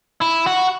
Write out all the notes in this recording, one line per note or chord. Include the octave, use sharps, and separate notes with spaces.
E4
F#4